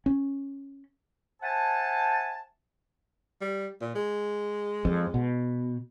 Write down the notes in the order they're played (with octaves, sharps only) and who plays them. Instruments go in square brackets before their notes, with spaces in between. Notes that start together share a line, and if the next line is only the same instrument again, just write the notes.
[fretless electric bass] C#4
[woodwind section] C5 E5 F#5 G#5 A5
[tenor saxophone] G3
A#2
G#3
[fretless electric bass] F2
B2